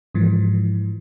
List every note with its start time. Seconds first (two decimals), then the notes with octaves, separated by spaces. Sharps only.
0.15 G#2 E3 F3